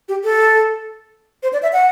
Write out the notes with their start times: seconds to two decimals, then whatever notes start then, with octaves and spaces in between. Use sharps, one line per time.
0.08 G4
0.24 A4
1.43 C5
1.53 D5
1.62 E5
1.73 F#5